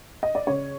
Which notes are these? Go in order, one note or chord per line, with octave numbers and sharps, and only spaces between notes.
D#5
D5
C#3 C#5